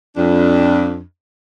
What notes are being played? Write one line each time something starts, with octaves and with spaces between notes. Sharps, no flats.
F2 D4